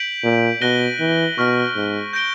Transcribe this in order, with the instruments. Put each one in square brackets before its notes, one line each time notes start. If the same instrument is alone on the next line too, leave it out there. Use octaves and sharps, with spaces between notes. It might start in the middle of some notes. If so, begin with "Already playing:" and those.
Already playing: [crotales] G6 B6 D7 F#7
[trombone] A#2
[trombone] B2 [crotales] F#6 A#6 D#7 G7
[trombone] E3
[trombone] B2 [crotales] C#6 F6 A#6
[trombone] G#2
[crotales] G6 A#6 D7 G7